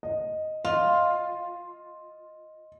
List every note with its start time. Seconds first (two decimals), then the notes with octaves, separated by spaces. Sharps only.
0.03 D#5
0.65 F4 D#5